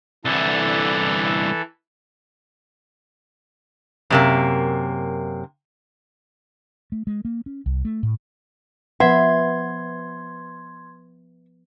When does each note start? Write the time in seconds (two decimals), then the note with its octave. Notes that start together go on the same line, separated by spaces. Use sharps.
0.25 C2 D3 E3 A4
4.10 F#2 C3 A#3
6.92 A3
7.07 G#3
7.25 A#3
7.46 C#4
7.66 C2
7.85 A3
8.03 A2
9.00 F3 B3 B4 E5 F#5 C6 G#6